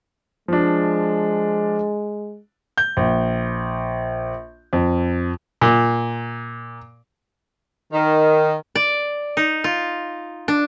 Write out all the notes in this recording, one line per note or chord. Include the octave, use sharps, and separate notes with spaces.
F3 G#3 D4
G6
A#1
F2
A#2
D#3
D5
D#4
F4
D4